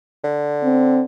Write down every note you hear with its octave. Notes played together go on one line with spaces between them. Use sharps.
D3
C4